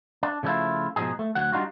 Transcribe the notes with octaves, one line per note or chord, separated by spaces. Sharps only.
D4
C#3 F3 A3 C#4 E4 F4
G#2 B2 E3 F3 D#4 G#4
A3
D2 F#3 F#5
G3 D4 D#4 F4 F#4